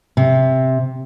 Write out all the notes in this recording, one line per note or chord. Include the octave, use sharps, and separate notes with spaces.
C3